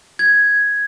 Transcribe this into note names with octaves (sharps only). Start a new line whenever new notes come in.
G#6